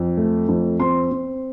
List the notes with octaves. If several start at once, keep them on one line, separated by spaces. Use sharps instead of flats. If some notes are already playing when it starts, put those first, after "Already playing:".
Already playing: F2
A3
F2
C4 C6
C4